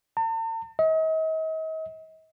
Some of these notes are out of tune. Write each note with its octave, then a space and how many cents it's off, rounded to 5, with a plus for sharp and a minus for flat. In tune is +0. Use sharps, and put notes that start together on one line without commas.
A5 +45
D#5 +40